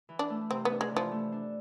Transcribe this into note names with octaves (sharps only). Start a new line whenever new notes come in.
E3
D4
A3
C3 C4
B3 D4
G#3
E3
F3
A3
D4